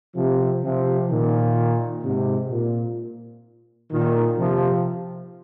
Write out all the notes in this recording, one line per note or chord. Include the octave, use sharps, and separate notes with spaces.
C3 F3
C3 F3
A#2 D#3
G#2 C3
A#2
A#2 D#3
C3 F3